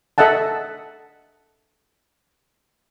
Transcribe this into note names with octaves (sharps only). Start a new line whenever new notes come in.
A4 D#5 E5 F#5 A5